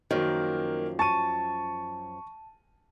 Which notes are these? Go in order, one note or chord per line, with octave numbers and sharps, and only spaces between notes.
F#2 D#3 F3 A#3
A5 C#6 D#7